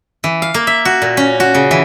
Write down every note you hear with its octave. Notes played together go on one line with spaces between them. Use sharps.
E3
F5
A#3
E5
F#4
A#2
C#4
F#4
C#3
E3